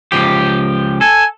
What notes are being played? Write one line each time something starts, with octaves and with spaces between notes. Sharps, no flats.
C#2 F3 G4
A4 G#5